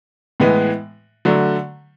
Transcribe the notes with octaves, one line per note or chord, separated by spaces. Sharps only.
A2 E3 G#3 B3
D3 F#3 A3